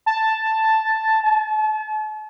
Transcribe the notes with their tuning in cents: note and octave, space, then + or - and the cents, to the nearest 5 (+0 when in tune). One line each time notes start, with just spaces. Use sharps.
A5 +0
A5 -40